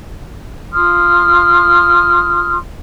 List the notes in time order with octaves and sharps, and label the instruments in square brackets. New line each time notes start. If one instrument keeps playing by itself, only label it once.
[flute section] F4 C6 D#6 F6